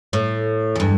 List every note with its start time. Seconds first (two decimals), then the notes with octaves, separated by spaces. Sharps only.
0.13 A2
0.75 E2 G2